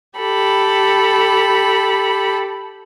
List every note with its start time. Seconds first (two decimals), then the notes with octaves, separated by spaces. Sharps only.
0.19 G4 A4 B5